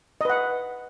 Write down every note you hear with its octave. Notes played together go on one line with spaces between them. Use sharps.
B4 D#5 F#5